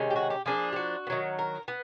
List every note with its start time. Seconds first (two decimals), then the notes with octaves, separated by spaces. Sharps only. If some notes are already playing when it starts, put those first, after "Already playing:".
Already playing: C3 D#3 G#3 C#4
0.10 G4
0.16 F#4
0.30 G4
0.46 F3 A#3 D4 G#4
0.72 G4
0.76 F#4
1.07 B3
1.10 D#3 F#3
1.39 A#4
1.68 B3